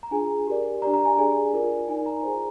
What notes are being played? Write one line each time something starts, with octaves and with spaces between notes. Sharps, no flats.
A#5
D4 F4 G#4 G#5
G4 A#4 D5
D4 G4 D5 A#5
A#5
G#5
D4 G#4 D5 G#5
F4 A#4 D5
D#4 A#4 D5 G#5
A#5
F4 G#4 C5